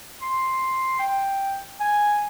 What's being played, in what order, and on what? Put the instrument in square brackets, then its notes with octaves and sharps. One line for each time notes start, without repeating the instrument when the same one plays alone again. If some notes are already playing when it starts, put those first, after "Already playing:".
[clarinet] C6
G5
G#5